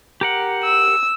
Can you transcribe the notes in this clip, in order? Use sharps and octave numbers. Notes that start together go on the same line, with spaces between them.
G4 A#4 F#5
E6